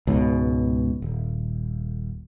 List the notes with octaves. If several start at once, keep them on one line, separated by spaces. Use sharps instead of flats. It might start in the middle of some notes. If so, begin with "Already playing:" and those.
C#2 G#2 B2
D#1